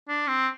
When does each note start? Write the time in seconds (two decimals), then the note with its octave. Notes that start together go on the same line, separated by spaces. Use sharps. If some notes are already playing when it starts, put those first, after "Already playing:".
0.08 D4
0.27 C4